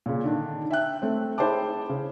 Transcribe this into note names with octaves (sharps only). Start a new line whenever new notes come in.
A#2 C#3
D3 D#3 D4
E5 G5 F#6
A3 C4
E4 G#4 C5 G5 A5 D6
C#3